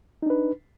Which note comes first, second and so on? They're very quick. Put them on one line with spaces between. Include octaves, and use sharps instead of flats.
D#4 D4 B4